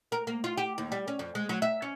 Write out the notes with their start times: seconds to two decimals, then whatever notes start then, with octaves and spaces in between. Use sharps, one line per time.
0.12 A#4
0.27 A#3
0.44 F4
0.57 G4
0.78 D#2
0.92 G3
1.08 C#4
1.19 F2
1.35 G#3
1.49 F#3
1.62 E5
1.82 C#4